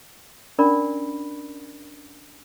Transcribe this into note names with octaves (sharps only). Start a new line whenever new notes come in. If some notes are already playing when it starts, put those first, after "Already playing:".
C#4 D4 A#4 D5 B5 C#6